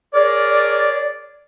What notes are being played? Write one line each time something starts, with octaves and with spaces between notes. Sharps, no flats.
G#4 A#4 C#5 D5